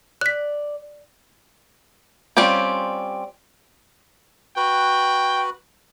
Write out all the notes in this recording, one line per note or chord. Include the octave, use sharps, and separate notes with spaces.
D5 F#6 B6
G3 C4 C#4 F4 G4
F#4 B4 G5